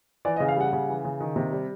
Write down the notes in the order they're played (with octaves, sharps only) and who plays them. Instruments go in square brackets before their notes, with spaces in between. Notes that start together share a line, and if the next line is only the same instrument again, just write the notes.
[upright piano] E3 D5
D#5
C#3
F5
G3 F#5
C#3
E3
C#3
D#3
C3
G3